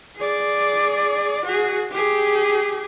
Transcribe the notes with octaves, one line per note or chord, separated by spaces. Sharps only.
G#4 D5
F#4 G#4
G4 G#4